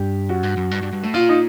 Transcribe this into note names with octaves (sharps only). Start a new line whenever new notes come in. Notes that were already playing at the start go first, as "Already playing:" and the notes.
Already playing: G2 G4
F#2 F#4
G2
F#2
G2
G2
G2
A2
A#2 F4
D#4